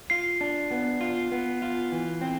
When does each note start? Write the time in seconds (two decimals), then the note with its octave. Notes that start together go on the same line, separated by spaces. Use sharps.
0.10 F4 C7
0.41 D4
0.71 B3
1.01 F4
1.32 B3
1.62 F4
1.92 E3
2.21 C4